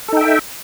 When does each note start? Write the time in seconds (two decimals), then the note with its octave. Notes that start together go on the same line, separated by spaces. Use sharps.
0.08 A4
0.13 D#4
0.17 G5
0.21 E5